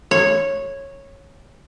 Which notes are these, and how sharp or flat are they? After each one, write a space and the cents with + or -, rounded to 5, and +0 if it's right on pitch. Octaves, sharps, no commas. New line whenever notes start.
C#5 -10